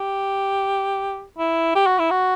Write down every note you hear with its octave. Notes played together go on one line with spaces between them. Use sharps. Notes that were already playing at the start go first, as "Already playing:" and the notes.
Already playing: G4
E4
G4
F#4
E4
F#4